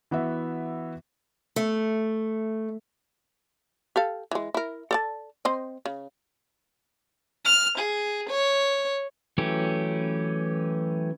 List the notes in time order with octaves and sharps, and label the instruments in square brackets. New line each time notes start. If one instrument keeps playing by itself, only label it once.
[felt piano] E3 B3 F#4 E5
[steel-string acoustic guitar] A3
[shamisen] G4 A4 F5
E3 G#3
E4 A#4
A4 D5 A5
C4 C5 D#5
C#3
[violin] F6
G#4
C#5
[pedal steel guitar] E3 F#3 A3 C#4 G4